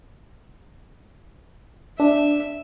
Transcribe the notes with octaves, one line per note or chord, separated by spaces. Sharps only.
D4 E5